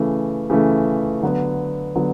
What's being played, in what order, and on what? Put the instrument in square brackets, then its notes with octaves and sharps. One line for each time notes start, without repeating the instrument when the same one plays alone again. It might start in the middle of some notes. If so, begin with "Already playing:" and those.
Already playing: [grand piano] C#3 E3 A3
C#3 E3 A3
D3 F#3 B3
D3 F#3 B3